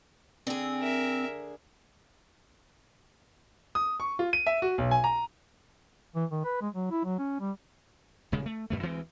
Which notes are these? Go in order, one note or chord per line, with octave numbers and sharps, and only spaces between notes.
D3 C4 G#4
A#4 E5
D#6
C#6
F4
D#7
E5
F#4
B1
G#5
A#5
E3
D#3
B4
G#3
F#3
E4
F#3
C#4
G3
D#1 C#3 G#3
A3
F#2 B2 A3
D2 E3 G#3 C4